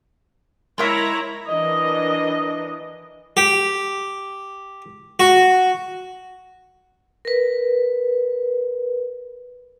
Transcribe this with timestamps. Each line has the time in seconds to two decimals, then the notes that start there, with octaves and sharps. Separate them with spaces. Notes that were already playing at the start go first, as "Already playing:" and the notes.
0.78 G#3 E4 A#4 C#5 E5 A#5
1.48 E3 D4 A#4 D#5
3.37 G4
5.20 F#4
7.25 A#4 B4